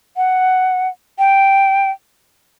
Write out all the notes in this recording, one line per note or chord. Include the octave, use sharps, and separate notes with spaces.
F#5
G5